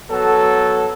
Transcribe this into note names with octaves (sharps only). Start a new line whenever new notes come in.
F#3 B3 A4